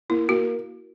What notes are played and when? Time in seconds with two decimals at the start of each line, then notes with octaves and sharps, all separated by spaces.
0.09 A#3 E4
0.29 A#3 F#4